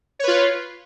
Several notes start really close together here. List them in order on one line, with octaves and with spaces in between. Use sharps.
C#5 B4 F4